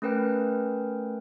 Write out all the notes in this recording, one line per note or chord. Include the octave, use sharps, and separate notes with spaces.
A3 C#4 A#4 B4 G5